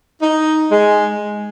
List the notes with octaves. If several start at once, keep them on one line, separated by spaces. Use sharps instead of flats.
D#4
G#3